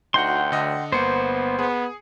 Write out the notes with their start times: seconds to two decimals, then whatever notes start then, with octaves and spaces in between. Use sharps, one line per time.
0.14 D2 D#4 F#4 F#5 G5 C6
0.52 D3 D#5
0.92 G1 A#3 B3 C5 C#7
1.59 B3 G#4